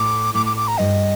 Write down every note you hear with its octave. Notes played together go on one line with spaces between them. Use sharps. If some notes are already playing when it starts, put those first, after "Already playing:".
Already playing: A2 D6
A2 D6
D6
D6
A#5
G2 D#5